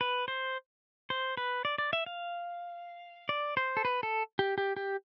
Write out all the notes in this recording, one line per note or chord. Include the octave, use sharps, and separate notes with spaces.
B4
C5
C5
B4
D5
D5
E5
F5
D5
C5
A4
B4
A4
G4
G4
G4